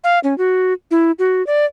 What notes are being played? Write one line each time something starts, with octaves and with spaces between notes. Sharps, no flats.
F5
C#4
F#4
E4
F#4
D5